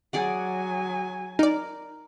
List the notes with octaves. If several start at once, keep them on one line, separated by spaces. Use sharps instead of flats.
F#3 G#4 D5 F#5 G#5
D#4 A#4 D5